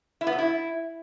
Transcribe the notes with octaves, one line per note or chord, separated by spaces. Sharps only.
E4
B3
F#3
E4